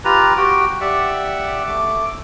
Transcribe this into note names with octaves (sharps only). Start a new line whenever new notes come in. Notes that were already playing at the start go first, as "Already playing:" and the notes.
F4 G4 B4 A#5
F#4 G4 G5
G4 D5 E5 F#5
A3 D6